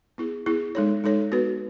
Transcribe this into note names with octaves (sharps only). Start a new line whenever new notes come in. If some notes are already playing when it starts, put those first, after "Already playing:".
B3 E4 G#4
B3 E4 G#4
G#3 D#4 A4 C#5
G#3 D#4 A4 C#5
B3 F#4 B4